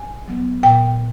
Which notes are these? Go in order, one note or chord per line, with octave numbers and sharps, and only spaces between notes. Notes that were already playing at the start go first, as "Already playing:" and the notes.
Already playing: G#5
F#3 B3
A#2 G5